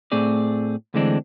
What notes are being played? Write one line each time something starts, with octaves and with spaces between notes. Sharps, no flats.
A2 A3 C4 G#4 D5
D2 D3 E3 G#3 C4 D4